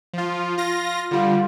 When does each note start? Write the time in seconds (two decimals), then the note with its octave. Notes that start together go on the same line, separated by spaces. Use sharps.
0.13 F3 F4
0.58 F4 A#6
1.11 D3 G3 F4